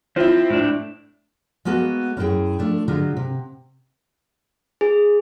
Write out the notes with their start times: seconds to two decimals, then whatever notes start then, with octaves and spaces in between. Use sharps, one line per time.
0.16 F3 C4 E4
0.50 A2 D4
1.65 G#3 A#3 B3 F#4 A4
2.17 F#2 B3 E4 G4 G#4 G5
2.59 F3 A3 D4
2.88 D3 F#3 G#3 F4
3.17 C3
4.81 G#4